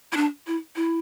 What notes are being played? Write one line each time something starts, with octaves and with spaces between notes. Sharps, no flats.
E4
D4
E4
E4